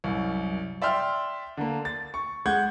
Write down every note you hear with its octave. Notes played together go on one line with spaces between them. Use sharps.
C2 F#2
D5 E5 G5 C6 F6
D3 A#3
A6
C#6
G#3 F#5 G6 G#6